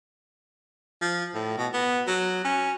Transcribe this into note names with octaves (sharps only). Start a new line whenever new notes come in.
F3
A2
B2
B3
F#3
C#4